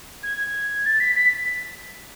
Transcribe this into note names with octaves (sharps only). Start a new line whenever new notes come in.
G#6
A6
B6
B6